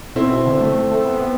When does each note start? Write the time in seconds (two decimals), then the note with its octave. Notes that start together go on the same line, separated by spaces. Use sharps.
0.15 B2 C4 E4
0.46 D3
0.61 A3
0.91 A3
1.05 B3